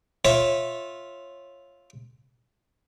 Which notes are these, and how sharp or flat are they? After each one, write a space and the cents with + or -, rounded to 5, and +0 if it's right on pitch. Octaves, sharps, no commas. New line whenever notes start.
F4 +0 C#5 -20 E5 -10